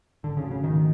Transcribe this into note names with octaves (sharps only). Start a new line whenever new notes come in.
G#2 D3
C#3
F3 A3 C#4 F#4
C#3
G#2 D#3